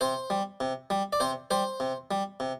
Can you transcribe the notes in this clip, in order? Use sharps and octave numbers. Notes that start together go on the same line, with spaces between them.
C3 C5
G3
C3
G3
D5
C3 C5
G3 C5
C3
G3
C3